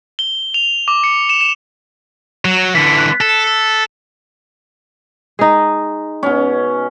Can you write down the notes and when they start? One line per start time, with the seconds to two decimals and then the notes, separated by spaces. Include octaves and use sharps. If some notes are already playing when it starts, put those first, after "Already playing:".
0.19 G7
0.54 F7
0.88 D6
1.04 C#7
1.29 E7
1.41 E7
2.45 F#3
2.75 D3 E3 B6
2.98 F#6
3.21 A4
5.39 G#3 D#4
6.23 B2 C#4